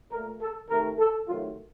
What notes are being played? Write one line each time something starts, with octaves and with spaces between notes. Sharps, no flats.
A#2 A3 A#4
A4
C3 D#3 A3 A#4
A4
C3 D#3 F#3 A3 F4